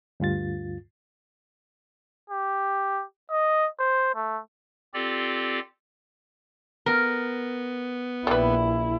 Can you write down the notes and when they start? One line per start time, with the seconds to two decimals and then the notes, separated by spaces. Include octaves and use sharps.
0.20 D2 G2 F4 A6
2.30 G4
3.31 D#5
3.79 C5
4.15 A3
4.94 C4 F4 G4 A4 D5
6.86 B3 A#4
8.27 A#1 G3 E4 B4